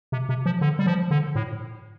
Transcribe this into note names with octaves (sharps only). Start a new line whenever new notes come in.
C3
C3
F3
D3
G3
F3
D3
A2